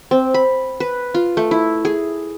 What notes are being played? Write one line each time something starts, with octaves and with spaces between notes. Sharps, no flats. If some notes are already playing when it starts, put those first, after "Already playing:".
C4
B5
B4
F4
A3
E4
G#4